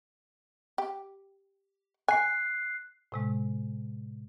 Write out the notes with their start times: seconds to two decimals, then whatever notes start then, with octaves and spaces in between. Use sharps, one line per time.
0.78 G4
2.08 G#5 F#6 C7
3.12 A2 C3 G#3